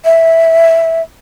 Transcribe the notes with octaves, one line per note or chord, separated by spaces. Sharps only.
E5